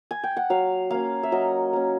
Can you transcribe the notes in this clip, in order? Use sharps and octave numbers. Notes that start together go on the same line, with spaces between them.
G#5
G5
F#5
F#3 F5
A#3 C#4 F5
E5
F#3 D#5
A#3 C#4